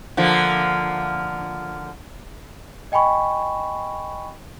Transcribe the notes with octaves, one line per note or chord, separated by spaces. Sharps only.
D3 F3 A#3
D#5 G5 G#5 B5 C#6